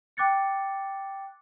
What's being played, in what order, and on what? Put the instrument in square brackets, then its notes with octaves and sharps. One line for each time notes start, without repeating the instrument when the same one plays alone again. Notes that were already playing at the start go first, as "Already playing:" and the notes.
[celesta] G5 D6 F#6 A6 C#7